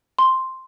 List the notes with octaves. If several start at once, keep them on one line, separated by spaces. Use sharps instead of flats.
C6